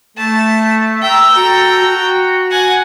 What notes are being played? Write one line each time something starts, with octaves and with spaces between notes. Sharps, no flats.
A3 A5
G5 A#5 E6
F#4 A4
F#4
F#5 G#5